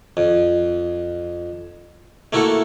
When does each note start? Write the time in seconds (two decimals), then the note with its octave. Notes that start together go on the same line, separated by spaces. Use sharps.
0.17 F2
2.33 A3 A#3 E4 F#4 A4